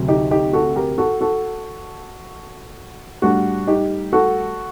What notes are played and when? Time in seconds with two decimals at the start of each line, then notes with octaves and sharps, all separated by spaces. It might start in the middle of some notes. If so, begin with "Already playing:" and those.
Already playing: D2 C3 F#3
0.08 D#4 G4
0.31 D#4 G4
0.53 F#4 A4
0.76 G4 A#4
0.98 F#4 A4
1.21 F#4 A4
3.22 A2 G3 D4 F#4
3.67 D#4 G4
4.12 F#4 A4